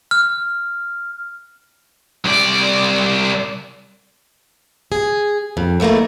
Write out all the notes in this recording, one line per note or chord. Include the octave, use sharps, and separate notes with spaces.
F6
C2 D5
G#4
F2
E2 E3 A3 A#3 D#4